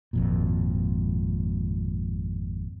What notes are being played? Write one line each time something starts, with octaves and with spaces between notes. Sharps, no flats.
G#1 F2 A#2